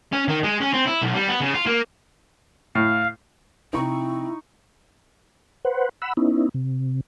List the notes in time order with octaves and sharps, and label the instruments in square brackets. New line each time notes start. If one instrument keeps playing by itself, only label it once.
[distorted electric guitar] C#4
D#3
G#3
C#4
C4
E4
B1
G3
B3
C#3
F4
A#3
[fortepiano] A2 [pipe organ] F5
[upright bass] C3 F3 [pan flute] C4 [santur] D#4 C#6 [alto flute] E4
[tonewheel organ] B4 C5 F#5
F#5 B5 E6
B3 C#4 D#4 E4
C3